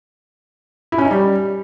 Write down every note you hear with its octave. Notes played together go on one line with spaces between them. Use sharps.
E4
C#4
D#4
G3